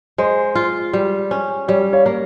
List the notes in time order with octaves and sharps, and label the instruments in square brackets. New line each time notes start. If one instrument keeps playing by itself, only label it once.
[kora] G#3 [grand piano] C5
[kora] F4
G3
C#4
[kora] G3 [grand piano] C#5
[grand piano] C#5 F5
[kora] A#3